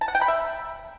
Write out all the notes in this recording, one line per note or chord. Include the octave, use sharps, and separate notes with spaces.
A5
F#5
G5
B5
E5